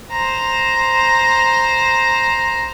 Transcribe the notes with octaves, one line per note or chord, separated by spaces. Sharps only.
C5 A#5